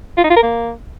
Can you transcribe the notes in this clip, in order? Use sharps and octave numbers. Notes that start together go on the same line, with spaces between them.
F4
D#4
F4
A#4
A#3